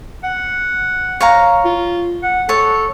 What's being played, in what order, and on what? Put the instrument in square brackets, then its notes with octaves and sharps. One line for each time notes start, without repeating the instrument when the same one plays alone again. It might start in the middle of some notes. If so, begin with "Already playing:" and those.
[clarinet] F#5
[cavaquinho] C#5 F5 A#5
[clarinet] F4
F#5
[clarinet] A4 [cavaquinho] C#5 A5